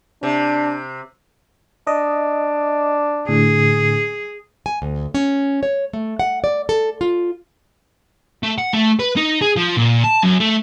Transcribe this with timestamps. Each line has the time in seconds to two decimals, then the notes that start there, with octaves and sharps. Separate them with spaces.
0.23 C3 D4
1.87 D4 D#5
3.29 A2 D3 G#4
4.66 G#5
4.82 D2
5.14 C#4
5.63 C#5
5.93 A3
6.19 F#5
6.44 D5
6.69 A4
7.01 F4
8.43 A3
8.58 F#5
8.73 A3
9.00 B4
9.17 D#4
9.42 G#4
9.56 F3
9.77 A#2
10.04 A5
10.23 F#2
10.40 A3